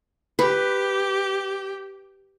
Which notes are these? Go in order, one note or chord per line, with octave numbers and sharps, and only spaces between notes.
G4 B4